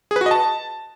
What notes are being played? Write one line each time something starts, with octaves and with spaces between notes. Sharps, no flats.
G#4
B4
F#4
D#5
A5